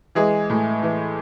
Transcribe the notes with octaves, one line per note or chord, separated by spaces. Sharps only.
E3 G#3 G#4
A2
E3